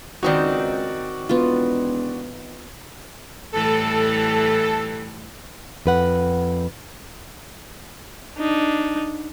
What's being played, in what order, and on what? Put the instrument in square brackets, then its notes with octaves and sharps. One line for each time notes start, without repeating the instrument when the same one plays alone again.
[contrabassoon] C#2 [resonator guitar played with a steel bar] D#3 C4 D#4 [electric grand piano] F#4 D5
[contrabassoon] E1 [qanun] B3 F4
[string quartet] A2 E3 G3 [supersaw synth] A4
[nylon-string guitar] F2 B4 F#5
[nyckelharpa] D4 D#4